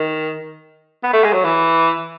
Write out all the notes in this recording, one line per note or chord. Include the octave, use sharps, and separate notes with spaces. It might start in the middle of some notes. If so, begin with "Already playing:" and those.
Already playing: D#3
B3
A3
G#3
F#3
E3